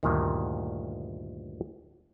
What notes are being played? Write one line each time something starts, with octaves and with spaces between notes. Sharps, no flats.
D2 G2 A#2 D#3